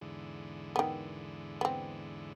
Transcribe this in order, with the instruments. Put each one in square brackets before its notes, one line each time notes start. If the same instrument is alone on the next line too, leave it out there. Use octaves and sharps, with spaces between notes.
[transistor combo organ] E2 G#2 D3
[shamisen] D#3 B3
B3 C4